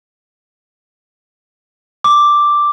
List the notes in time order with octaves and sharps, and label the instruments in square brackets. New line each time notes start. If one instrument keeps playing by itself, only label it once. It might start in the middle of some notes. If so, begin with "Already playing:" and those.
[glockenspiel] D6